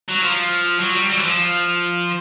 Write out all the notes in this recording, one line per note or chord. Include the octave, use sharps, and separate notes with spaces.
F#3
F3
F#3
G3
F#3
E3
F3